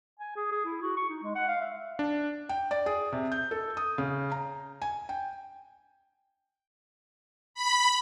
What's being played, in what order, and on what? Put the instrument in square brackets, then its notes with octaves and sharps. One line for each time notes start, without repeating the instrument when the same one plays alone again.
[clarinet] G#5
G#4
G#4
E4
F#4
C#6
D#4
G#3
F#5
F5
E5
[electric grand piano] D4
[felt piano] G5
D5
G#4
C3
G6
A4
D#6
C#3
A#5
G#5
G5
[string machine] B5